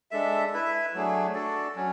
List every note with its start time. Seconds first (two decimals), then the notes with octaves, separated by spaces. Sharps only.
0.11 G#3 D4 A4 E5
0.53 E4 B4 E5
0.94 F#3 A3 D4 G#4
1.34 D4 F#4 A4 D5
1.76 F#3 C#4